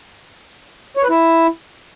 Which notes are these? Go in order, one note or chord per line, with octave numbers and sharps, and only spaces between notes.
C#5
B4
E4